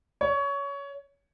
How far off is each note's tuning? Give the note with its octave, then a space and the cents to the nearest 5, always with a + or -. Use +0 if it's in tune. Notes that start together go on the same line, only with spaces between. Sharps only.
C#5 +20